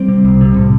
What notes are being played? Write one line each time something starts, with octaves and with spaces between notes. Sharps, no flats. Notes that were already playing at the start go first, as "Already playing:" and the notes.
Already playing: G3 C4
C3
C2
C3
A2